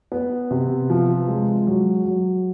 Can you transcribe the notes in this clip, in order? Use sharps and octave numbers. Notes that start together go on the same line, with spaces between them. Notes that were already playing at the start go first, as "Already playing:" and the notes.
B3
C3
F3
G#3
F#3
F#3